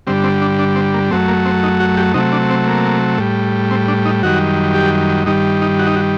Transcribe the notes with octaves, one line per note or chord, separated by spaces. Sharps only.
G2 D3 G3 C4
C4
D4
D4
C4
A#3
F#2 F#3 A3 C4
A#3
C4
D#4
F#4
G4
C3 F#3 A3 D#4
D4
C4
A#3
A2 G3
C4
D4
D#4
F#2 D#3 G3 F#4
G4
G2 D#3 G3 D#4
D#4
F#4
D#4
F#4